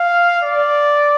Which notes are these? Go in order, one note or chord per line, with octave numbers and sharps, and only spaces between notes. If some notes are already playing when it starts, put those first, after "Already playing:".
Already playing: F5
D5